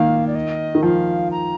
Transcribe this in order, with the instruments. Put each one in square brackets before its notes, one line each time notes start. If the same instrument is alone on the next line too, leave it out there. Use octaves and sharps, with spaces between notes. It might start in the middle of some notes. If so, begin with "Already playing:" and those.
Already playing: [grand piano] D#3 A#3 [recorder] F5
[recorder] D5
D#5
[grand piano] D#3
[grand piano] F3 [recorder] F5
[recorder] A#5